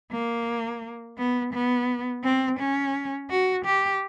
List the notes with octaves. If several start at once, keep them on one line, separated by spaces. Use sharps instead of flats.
A#3
B3
B3
C4
C#4
F#4
G4